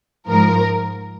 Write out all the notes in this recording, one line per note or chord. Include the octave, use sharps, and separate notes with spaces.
G#2 F3 A#4